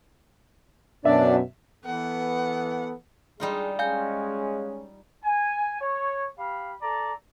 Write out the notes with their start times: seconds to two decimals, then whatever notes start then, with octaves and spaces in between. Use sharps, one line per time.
1.05 F#2 B2 D4 D5 E5
1.85 E3 B3 A4 F#5
3.40 G3 G#3 D#4 F4
3.79 G#3 C#4 F5 G#5 G6
5.24 G#5
5.81 C#5
6.39 G4 F5 B5
6.82 A4 D5 A#5